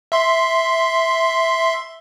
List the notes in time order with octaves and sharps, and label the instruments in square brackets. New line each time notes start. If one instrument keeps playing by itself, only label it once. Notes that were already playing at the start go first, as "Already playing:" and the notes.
[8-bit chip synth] E5 C6